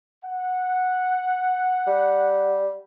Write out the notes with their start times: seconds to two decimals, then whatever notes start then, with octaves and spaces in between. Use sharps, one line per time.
0.24 F#5
1.87 G3